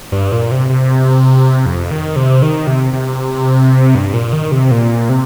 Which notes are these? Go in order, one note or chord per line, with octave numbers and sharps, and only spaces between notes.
G2
A#2
C3
C3
F2
D#3
C3
D#3
C3
C3
G2
A#2
D#3
C3
A#2
C3